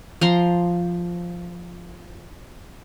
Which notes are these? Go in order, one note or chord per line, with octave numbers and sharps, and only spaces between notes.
F3 A#5 C6